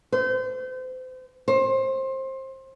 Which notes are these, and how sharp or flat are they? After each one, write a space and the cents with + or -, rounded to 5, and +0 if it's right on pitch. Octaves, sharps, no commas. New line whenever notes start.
C5 -35
C5 +25